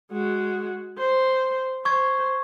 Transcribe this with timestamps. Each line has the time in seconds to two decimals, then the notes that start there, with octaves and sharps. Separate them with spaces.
0.12 G#3 F#4
0.98 C5
1.85 C5 C#6 G#6